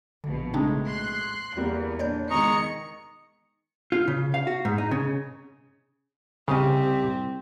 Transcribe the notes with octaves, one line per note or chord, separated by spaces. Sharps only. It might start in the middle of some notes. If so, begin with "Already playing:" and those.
A#1 B2 D3
A2 C#3 G#3 C4 D4 D#4
C6 F#6
E2 G3 A#3 B3
A#2 D4 C#5 D5 G6
B2 D#3 G#3 D#5 A#5 C#6 C#7
F4
C#3
F5
F#4
G#2
D#4
C#3
C2 C#3 C4 G4 D#5